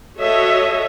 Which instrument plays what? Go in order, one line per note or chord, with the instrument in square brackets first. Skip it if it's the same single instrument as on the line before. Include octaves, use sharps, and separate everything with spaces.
[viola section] F#4 A4 C#5 D#5 E5